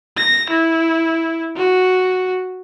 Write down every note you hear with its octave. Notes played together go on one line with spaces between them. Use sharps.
A#6
E4
F#4